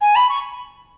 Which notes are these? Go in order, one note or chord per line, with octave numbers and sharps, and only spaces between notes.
G#5
B5
C#6